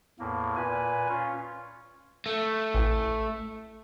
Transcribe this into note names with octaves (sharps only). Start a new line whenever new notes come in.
E2 A2 A#3
A#2 B4 G#5
C#4 F4
A3
A1